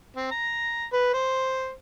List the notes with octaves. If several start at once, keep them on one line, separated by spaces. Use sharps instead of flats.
C4
A#5
B4
C5